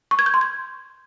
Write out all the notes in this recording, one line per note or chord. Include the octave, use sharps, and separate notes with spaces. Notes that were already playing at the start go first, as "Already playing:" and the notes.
C#6
G#6
G6
C6
G#6